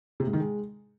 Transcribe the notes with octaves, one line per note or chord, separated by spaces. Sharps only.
C3
G#2
D#3
G#3